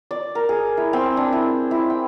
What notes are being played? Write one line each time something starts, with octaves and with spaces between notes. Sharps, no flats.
D5
A#4
G#4
E4
C4
D4
E4
E4
G5